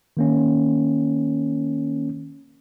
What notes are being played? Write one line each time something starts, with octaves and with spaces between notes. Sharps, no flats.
D#3 A#3 C#4